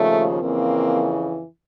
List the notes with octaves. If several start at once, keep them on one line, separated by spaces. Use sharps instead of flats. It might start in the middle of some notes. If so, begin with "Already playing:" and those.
Already playing: D#2 C#3 F3 A3
F2 C#3 E3 A#3 C4